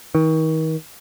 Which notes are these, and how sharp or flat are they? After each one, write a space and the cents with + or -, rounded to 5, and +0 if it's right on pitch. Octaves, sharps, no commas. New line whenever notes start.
D#3 +35